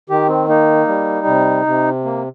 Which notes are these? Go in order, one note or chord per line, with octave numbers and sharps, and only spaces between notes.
D#3 G4
C4
A#3 D#4
G3
C3
C3
A#3